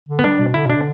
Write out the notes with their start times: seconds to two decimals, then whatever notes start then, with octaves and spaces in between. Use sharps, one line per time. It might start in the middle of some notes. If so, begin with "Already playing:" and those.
0.09 D3
0.19 B3
0.23 G3 D4
0.40 B2
0.54 D3 E4
0.66 B2 D4
0.76 D3